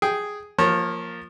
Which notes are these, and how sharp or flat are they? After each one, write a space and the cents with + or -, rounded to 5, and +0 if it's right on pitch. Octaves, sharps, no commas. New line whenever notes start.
G#4 +0 G5 -5
F3 +5 A#3 +0 C#5 -30